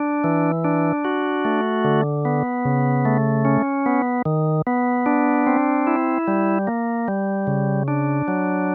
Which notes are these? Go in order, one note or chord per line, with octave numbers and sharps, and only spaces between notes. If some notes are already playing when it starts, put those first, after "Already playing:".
Already playing: D4
E3
D4
F#4
A3
D3
B3
C#3
A3
C#4
B3
D#3
B3
D4
C4
E4
G3
A#3
G3
C#3
D4
F#3